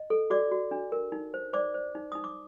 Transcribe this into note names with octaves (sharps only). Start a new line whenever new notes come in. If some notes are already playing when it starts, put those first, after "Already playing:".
Already playing: D#5
A4
F#4 D5 D6
F#4
D4
A#4
D#4
C5
C5 D5 D6
C5
D#4
D#4 D#6
D6